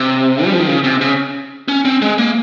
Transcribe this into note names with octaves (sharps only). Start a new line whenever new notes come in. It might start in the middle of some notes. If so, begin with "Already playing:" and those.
Already playing: C3
G3
F3
D#3
C#3
C3
C#3
C#4
C4
G#3
A#3